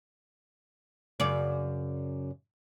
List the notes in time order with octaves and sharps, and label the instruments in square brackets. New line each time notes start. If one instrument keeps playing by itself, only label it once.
[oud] F#2 C#3 D5